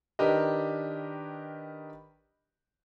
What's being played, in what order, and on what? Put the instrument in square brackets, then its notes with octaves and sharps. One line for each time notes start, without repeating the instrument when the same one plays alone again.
[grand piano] D#3 D4 G4 A#4 B4 D#5